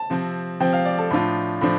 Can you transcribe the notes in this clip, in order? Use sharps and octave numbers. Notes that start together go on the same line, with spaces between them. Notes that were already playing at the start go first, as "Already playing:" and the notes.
Already playing: A5
C3 F3 C4
C3 F3 C4 G5
F5
D5
A4
A2 F3 D4 F4
A2 F3 D4